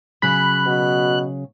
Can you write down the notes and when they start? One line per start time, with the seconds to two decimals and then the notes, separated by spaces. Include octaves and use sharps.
0.22 C#3 F#3 B5 F#6
0.66 B2